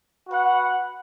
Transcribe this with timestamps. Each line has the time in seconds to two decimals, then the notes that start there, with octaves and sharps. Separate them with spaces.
0.28 F#4 B4 F#5